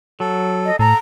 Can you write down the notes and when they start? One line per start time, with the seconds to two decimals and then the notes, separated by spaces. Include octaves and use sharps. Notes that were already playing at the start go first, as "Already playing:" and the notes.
0.20 F#3 A4
0.66 D#5
0.79 A2 A4 A#5